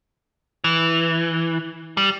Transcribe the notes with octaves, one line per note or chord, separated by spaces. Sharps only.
E3
G3